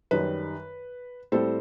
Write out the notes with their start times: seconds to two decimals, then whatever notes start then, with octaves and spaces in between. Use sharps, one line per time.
0.11 F#2 D#3 G3 B4
1.32 A2 G3 C4 A4 C5